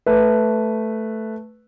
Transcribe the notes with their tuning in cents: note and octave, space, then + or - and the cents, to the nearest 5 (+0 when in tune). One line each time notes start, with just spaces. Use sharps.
A3 +0 B4 +0